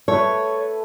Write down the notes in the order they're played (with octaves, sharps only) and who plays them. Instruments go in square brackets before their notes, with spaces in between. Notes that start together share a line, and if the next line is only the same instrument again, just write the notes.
[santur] A3 A4 B4 [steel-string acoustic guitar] C#5